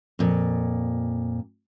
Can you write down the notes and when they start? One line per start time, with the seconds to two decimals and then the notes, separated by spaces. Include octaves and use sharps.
0.19 F2 A#2